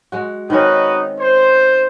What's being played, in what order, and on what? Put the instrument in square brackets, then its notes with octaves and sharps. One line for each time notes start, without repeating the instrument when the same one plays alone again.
[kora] G#3 F#4
[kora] D#3 C4 C#4 [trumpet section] D#4 F#4 B4
[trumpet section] C5